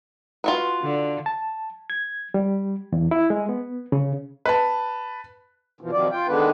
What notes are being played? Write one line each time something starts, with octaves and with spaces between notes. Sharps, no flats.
F4 F#4 B4
D3
A5
G#6
G3
E2
E4
G#3
B3
C#3
B4 A5
F#2 B2 E3 F3
C3 D#3 F3 F#3 D5
F4 G5
D3 D#3 G#3 B3 D4 B4